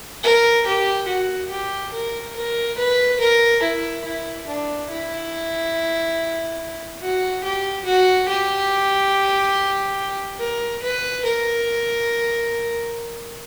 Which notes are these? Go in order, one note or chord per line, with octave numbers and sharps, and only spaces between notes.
A#4
G4
F#4
G4
A#4
A#4
B4
A#4
E4
E4
D4
E4
F#4
G4
F#4
G4
A#4
B4
A#4